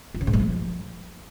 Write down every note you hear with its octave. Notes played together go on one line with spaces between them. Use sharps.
F3
C#3
G#2
G#3
F3